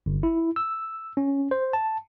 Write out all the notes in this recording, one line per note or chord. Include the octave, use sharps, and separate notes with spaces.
G1
E4
E6
C#4
C5
A5